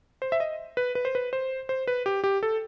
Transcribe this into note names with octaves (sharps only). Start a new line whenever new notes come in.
C5
E5
D#5
B4
B4
C5
B4
C5
C5
B4
G4
G4
A4